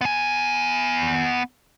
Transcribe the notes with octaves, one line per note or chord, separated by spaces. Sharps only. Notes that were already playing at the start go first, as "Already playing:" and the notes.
B3 G#5